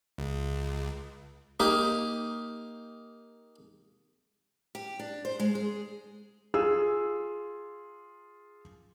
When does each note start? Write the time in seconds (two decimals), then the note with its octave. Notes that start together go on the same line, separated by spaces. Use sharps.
0.18 C#2
1.60 A#3 D#4 G4
4.75 G4
4.99 D4
5.25 C5
5.40 G#3
5.55 G#4
6.54 F4 G#4 E6